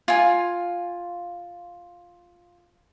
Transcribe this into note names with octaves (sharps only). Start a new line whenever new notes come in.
F4 G#5